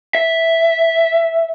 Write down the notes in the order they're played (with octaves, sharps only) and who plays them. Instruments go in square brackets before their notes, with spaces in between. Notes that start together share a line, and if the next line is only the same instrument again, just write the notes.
[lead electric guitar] E5